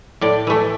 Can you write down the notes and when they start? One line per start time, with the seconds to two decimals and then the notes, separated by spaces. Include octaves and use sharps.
0.21 A2 D5
0.47 E3 A3